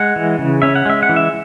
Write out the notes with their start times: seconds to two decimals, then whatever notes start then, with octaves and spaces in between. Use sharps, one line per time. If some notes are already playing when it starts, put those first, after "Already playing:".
Already playing: G#3 F#5
0.16 E3
0.39 C#3
0.62 C#4 E5
0.76 F#5
0.86 G#3 E5
1.03 F#5
1.09 E3
1.16 E5